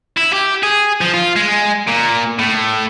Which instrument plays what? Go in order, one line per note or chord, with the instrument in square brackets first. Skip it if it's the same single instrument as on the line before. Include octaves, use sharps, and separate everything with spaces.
[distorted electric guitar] E4
G4
G#4
F3
F4
G#3
A#2
A2